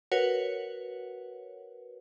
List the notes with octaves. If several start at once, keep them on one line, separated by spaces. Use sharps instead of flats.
F#4 A#4 B4 C#5 F#5